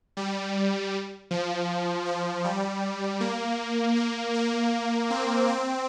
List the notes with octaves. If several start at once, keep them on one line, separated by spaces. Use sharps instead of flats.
G3
F3
F3
G3
A#3
A#3
A#3
C4
C4